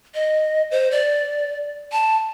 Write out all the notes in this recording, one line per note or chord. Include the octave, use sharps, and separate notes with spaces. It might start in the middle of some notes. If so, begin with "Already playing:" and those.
D#5
C5
D5
A5